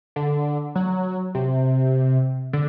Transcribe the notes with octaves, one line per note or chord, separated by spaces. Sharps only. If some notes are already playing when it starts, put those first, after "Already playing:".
D3
F#3
C3
D3